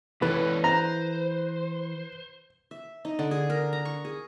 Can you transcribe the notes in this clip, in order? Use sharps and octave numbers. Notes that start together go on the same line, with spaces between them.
E3 B3 A4 B4 C#5 D5
C5 A#5
E5
D#4
D3
G#4
A#4
A#5
C#6
G#4